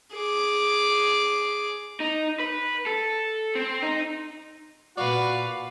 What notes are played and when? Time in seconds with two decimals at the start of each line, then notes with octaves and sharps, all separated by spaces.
0.15 G#4 D6
2.00 D#4
2.40 B4
2.86 A4
3.55 C4
3.82 D#4
4.97 A#2 F#4 B4 D5 F5